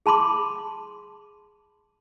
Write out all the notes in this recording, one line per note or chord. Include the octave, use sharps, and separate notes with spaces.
G#4 A5 B5 C6 D6